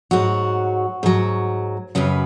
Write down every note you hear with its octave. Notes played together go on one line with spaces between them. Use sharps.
G#2 F#3 F#4
G#2 F#3
F#2 C#3 F#3 B4